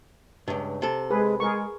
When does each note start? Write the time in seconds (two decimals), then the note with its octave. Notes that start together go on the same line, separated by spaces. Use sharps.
0.48 C#2 G2
0.82 C3 A4
1.10 G#3 G#4 B4
1.40 G#3 G#4 A#4 C#6